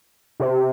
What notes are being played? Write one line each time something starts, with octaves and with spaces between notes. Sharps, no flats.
C3